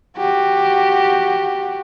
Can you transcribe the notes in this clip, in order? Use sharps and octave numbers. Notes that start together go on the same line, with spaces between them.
F#4 G4